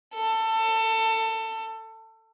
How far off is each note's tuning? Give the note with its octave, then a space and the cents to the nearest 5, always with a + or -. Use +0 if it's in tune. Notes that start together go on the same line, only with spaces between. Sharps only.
A4 +25